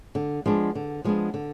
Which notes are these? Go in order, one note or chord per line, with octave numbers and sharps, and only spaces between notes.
D3
F3 G#3 B3 D4
D3
F3 G#3 B3 D4
D3